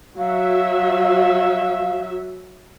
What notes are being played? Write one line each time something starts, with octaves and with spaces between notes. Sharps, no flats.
F#3 F#4 E5 F5